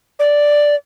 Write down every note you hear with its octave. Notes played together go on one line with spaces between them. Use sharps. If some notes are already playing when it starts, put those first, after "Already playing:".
D5